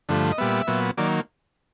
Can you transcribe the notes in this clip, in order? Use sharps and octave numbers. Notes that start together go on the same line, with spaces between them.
G2 D3 F3 A3
D#5
A#2 G3 B3 E5
A#2 F#3 B3
D#3 F#3 A#3 D5